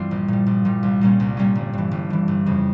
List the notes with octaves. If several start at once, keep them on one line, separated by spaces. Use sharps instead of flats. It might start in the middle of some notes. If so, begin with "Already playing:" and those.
Already playing: G2 E3 G3 C4 F4
A#1
A#2 G3
A#1
A#2 G3
C2
A#2 G3 A#3 C#4
C2
A#2 G3 A#3 C#4
G1
G2 E3
G1
G2 E3
G1
F2 C#3